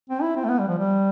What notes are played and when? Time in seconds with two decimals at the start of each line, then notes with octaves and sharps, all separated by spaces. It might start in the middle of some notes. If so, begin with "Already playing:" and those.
0.10 C4
0.22 E4
0.36 C4
0.45 A3
0.49 B3
0.59 G3
0.69 F3
0.78 G3